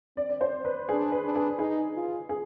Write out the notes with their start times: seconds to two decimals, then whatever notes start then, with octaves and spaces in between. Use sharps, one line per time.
0.17 C4 D5
0.29 D5
0.41 C5
0.65 B4
0.89 D4 G#4
1.12 B4
1.24 D4
1.35 G#4
1.58 D#4 G#4
1.95 F4
2.29 G#4